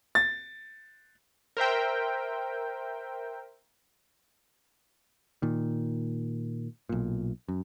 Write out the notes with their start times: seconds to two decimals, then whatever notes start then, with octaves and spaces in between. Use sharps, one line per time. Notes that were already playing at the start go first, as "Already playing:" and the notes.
0.15 A6
1.57 A#4 C5 E5 G5
5.42 A#2 D#3
6.89 B1 A#2
7.49 F#2